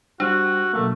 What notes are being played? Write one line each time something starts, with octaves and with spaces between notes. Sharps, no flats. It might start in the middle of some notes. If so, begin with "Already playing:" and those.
G3 D4 F#4 C5
B2 F#3 A3 A#3